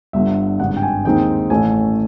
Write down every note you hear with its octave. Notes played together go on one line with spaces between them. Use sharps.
G1 G2 D3 E5
G#1 G2 D3 F#5
G5
G#5
D#2 D#3 G#3 C4 D#4 G5
A1 A2 E3 A3 C#4 G#5